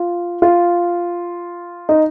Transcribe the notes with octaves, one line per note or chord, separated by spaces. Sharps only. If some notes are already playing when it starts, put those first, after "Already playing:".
Already playing: F4
F4
D#4